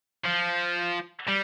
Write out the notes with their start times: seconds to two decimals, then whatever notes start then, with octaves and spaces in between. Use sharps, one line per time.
0.24 F3
1.28 G3